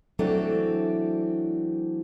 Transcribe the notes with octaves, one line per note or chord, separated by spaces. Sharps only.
E3 F#3 A3 C4 D4 A4